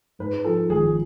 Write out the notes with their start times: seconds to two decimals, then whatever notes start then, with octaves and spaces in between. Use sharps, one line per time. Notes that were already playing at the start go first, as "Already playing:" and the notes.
0.19 G#2 B4
0.45 F3 A4
0.69 G#1 G#4